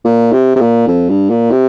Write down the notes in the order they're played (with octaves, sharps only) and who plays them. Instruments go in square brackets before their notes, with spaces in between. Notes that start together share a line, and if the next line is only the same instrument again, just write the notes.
[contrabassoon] A#2
C3
C3
A#2
F2
G2
A#2
C3